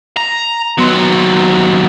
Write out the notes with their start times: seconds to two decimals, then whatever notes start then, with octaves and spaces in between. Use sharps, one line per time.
0.17 A#5
0.78 D#2 F#3 B3 C6